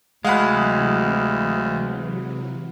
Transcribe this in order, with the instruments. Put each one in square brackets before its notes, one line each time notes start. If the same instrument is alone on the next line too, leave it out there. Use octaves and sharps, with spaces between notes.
[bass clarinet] D2 [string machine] C3 E3 F#3 [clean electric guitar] G#3 [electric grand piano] F5 F#5 B5